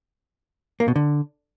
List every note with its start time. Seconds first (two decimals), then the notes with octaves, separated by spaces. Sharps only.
0.80 A#3
0.88 B2
0.96 D3